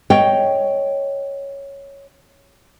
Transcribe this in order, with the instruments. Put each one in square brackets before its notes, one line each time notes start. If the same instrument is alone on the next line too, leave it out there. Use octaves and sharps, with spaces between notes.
[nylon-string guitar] C#5 D#5 G5